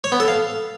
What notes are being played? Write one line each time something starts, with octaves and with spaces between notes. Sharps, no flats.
C#5
B3
A4
F5